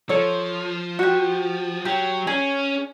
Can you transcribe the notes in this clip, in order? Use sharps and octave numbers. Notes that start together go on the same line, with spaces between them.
F3 A4 C#5
F#4 G4
F#3 G4
C#4 G#4